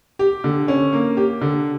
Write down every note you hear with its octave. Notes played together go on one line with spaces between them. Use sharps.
G4
D3
C#4
A#3
G4
D3